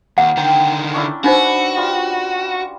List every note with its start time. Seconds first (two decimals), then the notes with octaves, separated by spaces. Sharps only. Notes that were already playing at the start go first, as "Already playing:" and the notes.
0.18 D#2 A#3 F#5
0.37 D3 D#3 G5 A#5
0.93 C#4 D4 E4
1.24 D4 D#4 F#4 B4 C5
1.77 G3 F4